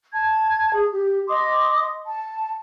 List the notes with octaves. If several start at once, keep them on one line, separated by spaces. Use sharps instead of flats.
A5 G#6
G#4
G4
D#5 C6 D6 D#6
A5